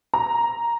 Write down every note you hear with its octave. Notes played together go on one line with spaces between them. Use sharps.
A#5